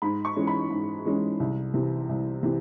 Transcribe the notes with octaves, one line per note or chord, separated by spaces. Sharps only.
G#2 B5
C#6
E3 G#3 C#4
B5
G#2
E3 G#3 C#4
C2
C3 E3
C2
C3 E3